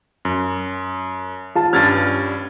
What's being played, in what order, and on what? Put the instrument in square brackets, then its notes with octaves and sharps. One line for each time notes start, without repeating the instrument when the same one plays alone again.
[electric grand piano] F#2
[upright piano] F4 A5
[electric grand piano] G2 G3 C#4 [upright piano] F6 G#6 A6